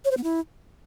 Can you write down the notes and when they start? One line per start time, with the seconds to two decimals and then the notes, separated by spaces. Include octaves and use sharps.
0.05 C#5
0.11 C5
0.17 B3
0.24 E4